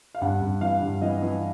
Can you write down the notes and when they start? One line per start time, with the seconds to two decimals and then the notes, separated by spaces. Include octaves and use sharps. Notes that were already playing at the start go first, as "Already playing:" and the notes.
0.15 F5
0.21 G2 F#5
0.41 G2
0.61 E3 F5
0.82 G2
1.02 E3 D#5
1.22 E3